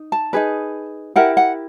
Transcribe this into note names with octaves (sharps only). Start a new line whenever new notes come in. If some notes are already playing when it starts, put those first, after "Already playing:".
Already playing: D#4
A5
D#4 G#4 B4
E4 G4 A#4 F#5
F#5